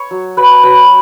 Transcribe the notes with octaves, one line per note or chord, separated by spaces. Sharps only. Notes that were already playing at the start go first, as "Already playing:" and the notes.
Already playing: C#5 C#6
F#3
F#3 B4 B5
A5
F#3 B4 B5